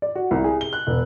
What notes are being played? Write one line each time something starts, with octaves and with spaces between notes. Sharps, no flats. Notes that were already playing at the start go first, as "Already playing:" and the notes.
D5
F#4
C2
G#4
G7
F#6
E1